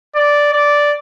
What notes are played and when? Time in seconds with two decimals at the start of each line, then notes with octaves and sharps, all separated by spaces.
0.15 D5
0.53 D5